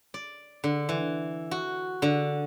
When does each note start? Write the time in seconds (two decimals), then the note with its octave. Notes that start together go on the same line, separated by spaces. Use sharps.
0.14 D5
0.64 D3
0.89 E3
1.51 F#4
2.02 D3